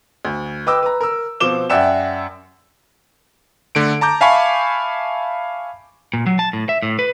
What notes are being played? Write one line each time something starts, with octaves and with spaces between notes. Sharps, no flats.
D2
B4 D#5 G5 D6 E6
B4 A#5
A#4 E6
B2 F3 C4 D6 E7 G7
F#2 D5 E5 F#5 G5 E7
D3 A3 D7
A5 A#5 D6 G6
E5 F5 G#5 A5 B5 C#6
A#2
F#3
A5
A2
E5
A2
B4